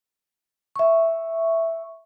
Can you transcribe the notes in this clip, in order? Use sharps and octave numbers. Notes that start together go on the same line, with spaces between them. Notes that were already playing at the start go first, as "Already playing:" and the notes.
E5 C#6